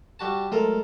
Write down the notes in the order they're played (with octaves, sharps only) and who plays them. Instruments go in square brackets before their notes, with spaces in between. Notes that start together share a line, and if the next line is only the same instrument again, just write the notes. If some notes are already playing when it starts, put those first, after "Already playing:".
[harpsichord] G3 F#4 A5
[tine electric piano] F#3 G#3 A3 [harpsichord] F4 A4 A#4